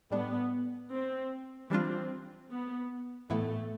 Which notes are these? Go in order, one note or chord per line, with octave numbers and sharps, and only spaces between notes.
A2 G3 B3 D4
C4
E3 G3 C4 D4 F4
B3
A2 E3 A3 B3 E4